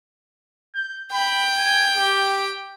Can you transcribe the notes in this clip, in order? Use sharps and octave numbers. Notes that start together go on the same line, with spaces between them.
G6
G5 B5
G#5
G4